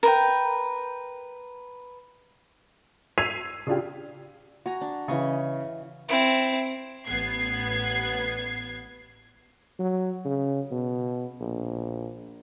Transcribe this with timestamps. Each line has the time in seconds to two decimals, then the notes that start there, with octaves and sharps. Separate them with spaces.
0.03 A#4 B4 G5
3.18 E6 G#6 B6 C7 D#7 F7
3.67 C#3 D4 F4 G4
4.66 F#4 G#5 A#5
4.81 D4
5.08 C#3 E3 D#5 C#6
6.09 C4 E4
7.06 A1 B3 G#6 C7
9.79 F#3
10.25 C#3
10.71 B2
11.40 A#1